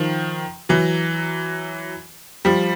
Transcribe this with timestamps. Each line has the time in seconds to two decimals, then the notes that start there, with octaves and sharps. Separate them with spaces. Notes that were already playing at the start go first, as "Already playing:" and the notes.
Already playing: D#3 F3
0.69 E3 F#3
2.45 F3 G3